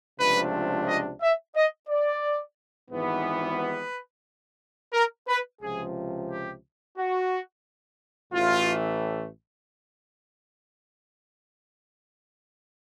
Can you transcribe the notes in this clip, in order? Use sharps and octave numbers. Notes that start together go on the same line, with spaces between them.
C#2 C3 F3 A3 D4 B4
D#5
E5
D#5
D5
G#1 G#2 E3 G3 B3
B4
A#4
B4
C#2 C3 F3 G#4
G4
F#4
A1 A2 E3 A3 F4